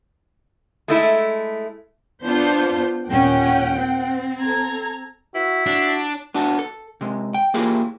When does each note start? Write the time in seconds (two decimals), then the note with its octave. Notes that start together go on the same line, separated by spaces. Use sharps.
0.88 G#3 A3 E4
2.24 B3 D4 F4 C5 G6
3.08 D#2 A#2 C#4 F#5 G5
3.76 C4
4.40 A4 A#5 G#6
5.35 E4 F#4
5.66 D4 F#4
6.34 B3 D4 F#4 A5
6.59 A4
7.01 C3 G#3
7.34 G5
7.54 A#3 E4 F4 G4 G#4 A#4